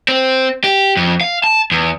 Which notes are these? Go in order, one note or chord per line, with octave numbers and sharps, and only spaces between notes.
C4
G4
F2
F5
A5
E2